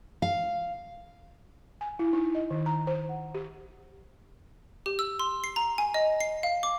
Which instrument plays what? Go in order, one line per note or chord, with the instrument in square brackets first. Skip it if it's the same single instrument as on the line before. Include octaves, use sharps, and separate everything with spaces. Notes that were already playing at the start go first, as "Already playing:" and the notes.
[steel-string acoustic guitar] F5
[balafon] G#5
E4
D#4
D#5
D#3
A#5
C5
F#5
G4
[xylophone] G4
E6
C6
C7
A#5
G#5
D#5
C7
F5
D6